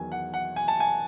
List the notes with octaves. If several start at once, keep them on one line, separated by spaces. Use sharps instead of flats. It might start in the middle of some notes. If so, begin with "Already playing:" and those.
Already playing: E2 D#3 F#3 G#5
F#5
F#5
G#5
A5
G#5